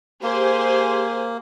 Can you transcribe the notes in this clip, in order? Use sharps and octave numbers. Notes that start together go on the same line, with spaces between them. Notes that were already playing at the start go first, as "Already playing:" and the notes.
A#3 G4 G#4 C5